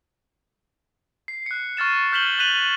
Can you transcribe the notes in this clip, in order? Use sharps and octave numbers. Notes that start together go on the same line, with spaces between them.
C7
F#6 C#7
C#6 F6 A6 E7
F6 G6 B6 E7 F#7 G7
F#6 G6 B6 D#7 F7 F#7